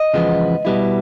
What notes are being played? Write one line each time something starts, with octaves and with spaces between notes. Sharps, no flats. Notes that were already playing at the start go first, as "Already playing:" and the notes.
Already playing: D#5
E2 C#3 F3 G#3 B3
B2 G3 B3 E4